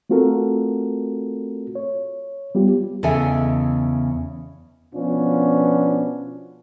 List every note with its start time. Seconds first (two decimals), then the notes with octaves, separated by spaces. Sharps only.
0.10 A3 C4 F4 F#4 A4 A#4
1.75 C#5
2.55 G3 B3 F4 G4
3.03 E2 C#3 A4 D#5 E5 G#5
4.94 B2 F3 B3 C#4 D4 F4